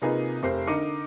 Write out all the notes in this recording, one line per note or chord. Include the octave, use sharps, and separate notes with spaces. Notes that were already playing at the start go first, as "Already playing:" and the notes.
C3 A#3 D#4 F4 G#4 B4
F1 G4 A#4 C5 C7
D3 D#4 A#4 D6 C#7 D#7